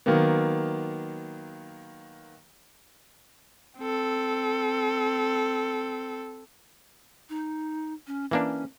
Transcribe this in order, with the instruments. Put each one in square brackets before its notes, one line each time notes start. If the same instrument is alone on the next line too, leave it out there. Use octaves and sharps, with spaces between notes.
[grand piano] D#3 F#3 A#3 B3
[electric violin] C4 A4
[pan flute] D#4
C#4
[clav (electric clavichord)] E3 A#3 D4 [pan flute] C#4